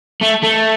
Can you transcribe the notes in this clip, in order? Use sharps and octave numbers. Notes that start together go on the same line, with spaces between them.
A3
A3